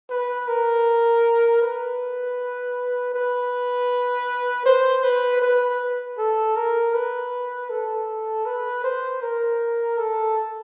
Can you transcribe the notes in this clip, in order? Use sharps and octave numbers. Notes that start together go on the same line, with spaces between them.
B4
A#4
B4
B4
C5
B4
B4
A4
A#4
B4
A4
B4
C5
A#4
A4